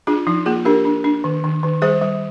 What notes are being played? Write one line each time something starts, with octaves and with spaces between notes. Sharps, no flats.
D4 F4 G#4
F3 D#4
A#3 F4 G#4
D4 G4 A#4
D4
D4
D#3
D#3
D#3
G3 G#4 C5
G3